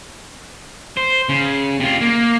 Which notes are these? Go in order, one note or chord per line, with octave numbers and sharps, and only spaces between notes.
C5
C#3
C3 F4
A#3